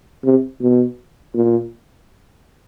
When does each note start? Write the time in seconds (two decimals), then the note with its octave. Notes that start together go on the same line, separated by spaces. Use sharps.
0.25 C3
0.61 B2
1.35 A#2